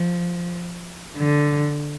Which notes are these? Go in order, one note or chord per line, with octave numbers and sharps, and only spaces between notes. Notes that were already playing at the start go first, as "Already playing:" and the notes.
Already playing: F3
D3